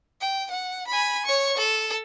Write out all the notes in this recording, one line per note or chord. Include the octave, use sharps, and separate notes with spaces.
G5
F#5
G#5 B5
C#5 C#6
A4